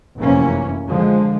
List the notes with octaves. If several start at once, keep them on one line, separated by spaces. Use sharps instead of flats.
F1 F#2 C3 E3 A#3 C#4
D3 F3 G#3